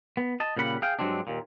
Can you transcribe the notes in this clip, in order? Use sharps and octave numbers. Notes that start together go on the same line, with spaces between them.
B3
D#5 A5
A#2 C#3 G3 F#5 B5
G#4 F5 G5
G2 F#3 G#3 C4 D4
D#2 A#2